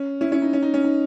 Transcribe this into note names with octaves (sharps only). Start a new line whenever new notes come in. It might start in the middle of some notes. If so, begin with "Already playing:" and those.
Already playing: C#4
C#4 E4
C#4 E4
D#4
C#4
D#4
C#4
D#4